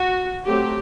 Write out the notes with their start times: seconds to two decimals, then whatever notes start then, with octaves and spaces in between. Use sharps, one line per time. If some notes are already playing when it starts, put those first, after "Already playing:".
Already playing: F#4
0.46 F#3 A3 C4 G4